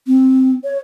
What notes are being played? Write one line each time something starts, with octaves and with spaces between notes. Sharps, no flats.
C4
C#5